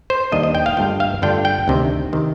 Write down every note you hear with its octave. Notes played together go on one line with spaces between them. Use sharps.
C5
D#2 D#3 G3 A#3 D4 D#5
D#5
G5
F5
G2 D3 A3 D4 F4 G5
F5
G2 D3 A3 D4 F4 G5
G5
D2 C3 D#3
C3 D#3